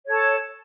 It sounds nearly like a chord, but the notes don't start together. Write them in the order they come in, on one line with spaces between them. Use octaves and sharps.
C#5 A4 A5